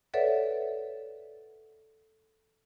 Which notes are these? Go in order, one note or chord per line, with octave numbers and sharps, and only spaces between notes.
A4 B4 C#5 D5 E5 F#5